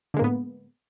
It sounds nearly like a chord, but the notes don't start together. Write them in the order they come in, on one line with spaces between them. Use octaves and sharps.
D3 G#3 A#3 A2 B3